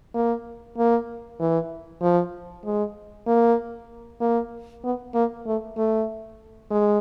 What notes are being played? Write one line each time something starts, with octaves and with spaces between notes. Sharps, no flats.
A#3
A#3
E3
F3
G#3
A#3
A#3
B3
A#3
A3
A3
G#3